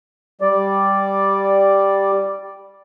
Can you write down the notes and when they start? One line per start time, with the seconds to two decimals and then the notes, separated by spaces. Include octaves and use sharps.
0.41 G3 D5